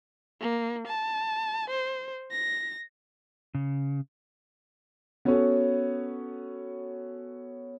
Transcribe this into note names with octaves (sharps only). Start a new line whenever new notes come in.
A#3
A5
C5
A#6
C#3
B3 C#4 F#4 A4 C#5